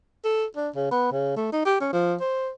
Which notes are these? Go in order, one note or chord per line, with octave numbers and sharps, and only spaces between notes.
A4
D4
C#3
B3
C#3
A3
D#4
G4
C#4
F3
C5